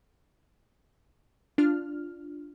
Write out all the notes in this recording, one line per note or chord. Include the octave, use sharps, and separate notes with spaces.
D4 F4 F6